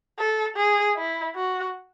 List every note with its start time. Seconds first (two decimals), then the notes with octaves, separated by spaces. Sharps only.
0.18 A4
0.57 G#4
0.96 E4
1.35 F#4